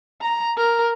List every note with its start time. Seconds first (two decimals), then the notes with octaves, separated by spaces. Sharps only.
0.21 A#5
0.57 A#4